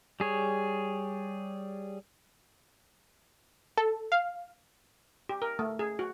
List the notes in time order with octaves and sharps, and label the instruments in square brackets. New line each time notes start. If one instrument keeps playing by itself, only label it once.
[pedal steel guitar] G3 G#4 C#5
[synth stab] A4
F5
[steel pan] G4
A#4
A3
G#4
F#4